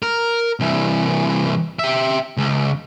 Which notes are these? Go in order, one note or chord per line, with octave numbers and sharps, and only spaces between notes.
A#4
C2 E3
G4 E5
C#2